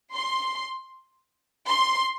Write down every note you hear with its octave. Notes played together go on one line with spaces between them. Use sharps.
C6
C6